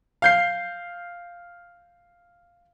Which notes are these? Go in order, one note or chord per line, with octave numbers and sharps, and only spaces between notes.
F5 G6 C7